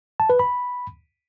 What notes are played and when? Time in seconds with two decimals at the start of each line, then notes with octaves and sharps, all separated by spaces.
0.20 A5
0.30 B4
0.39 B5